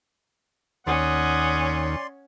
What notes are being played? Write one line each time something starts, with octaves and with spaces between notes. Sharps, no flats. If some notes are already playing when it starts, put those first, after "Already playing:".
D#2 C#4 D5 F#5 C6 D#6